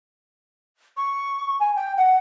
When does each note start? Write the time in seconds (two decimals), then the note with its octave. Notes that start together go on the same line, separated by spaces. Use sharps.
0.97 C#6
1.60 G#5
1.76 G5
1.97 F#5